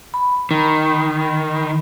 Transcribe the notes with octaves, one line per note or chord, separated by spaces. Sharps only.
B5
D#3